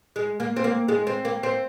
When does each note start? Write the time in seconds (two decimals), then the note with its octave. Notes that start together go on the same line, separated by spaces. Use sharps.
0.16 G#3
0.40 A#3
0.56 C4
0.64 A#3
0.88 G#3
1.07 C4
1.25 A#3
1.43 C4